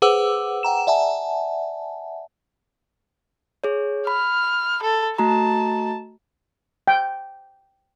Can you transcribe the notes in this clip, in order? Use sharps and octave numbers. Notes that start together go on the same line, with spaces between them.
G#4 B4 C5 F#5 D6 E6
F#5 G5 A#5 E7
D5 E5 F#5 G#5 A5
G#4 C#5
B5 F6
A4
A3 F#4 A5 A#5
G5